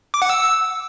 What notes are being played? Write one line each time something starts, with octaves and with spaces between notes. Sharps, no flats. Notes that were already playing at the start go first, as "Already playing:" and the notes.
D6
F#5
E6